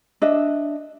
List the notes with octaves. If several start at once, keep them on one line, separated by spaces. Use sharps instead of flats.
D4 D#5 E5